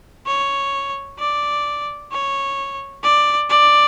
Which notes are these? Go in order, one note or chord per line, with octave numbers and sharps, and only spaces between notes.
C#5
D5
C#5
D5
D5